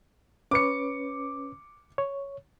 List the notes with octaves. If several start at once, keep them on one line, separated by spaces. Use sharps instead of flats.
C#4 B4 C#5 D6 C#7
C#5